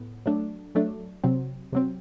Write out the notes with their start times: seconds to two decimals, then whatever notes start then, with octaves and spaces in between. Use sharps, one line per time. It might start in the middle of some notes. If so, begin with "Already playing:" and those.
Already playing: A2 B3
0.26 F#3 A3 D4
0.75 F#3 A3 D4
1.24 C3 F#3 C4
1.73 C3 F#3 C4